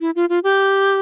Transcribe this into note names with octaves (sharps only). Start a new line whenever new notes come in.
E4
F4
F4
G4